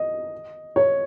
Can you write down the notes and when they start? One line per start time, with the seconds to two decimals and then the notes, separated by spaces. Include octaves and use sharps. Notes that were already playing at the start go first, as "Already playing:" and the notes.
Already playing: D#5
0.76 C#5